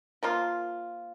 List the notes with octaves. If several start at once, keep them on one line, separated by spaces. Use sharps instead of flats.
F3 A#3 F4